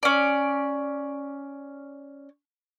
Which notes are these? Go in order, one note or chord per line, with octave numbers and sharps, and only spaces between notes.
C#4 D5